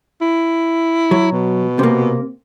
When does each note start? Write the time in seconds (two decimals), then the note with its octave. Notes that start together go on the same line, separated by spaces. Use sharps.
0.21 E4
1.11 F#3
1.32 B2
1.79 C3 A#3